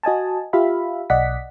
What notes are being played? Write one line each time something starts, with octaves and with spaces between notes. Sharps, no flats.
F#4 D#5 G#5 A5
F4 G4 E5 F5 B5
B1 D5 D#5 F#5 B6